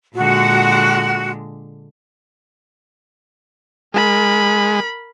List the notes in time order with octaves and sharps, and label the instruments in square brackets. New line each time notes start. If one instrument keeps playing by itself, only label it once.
[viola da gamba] A#2 D3 G#3 [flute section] F#4
[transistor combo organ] G#3 [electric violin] A#4 B5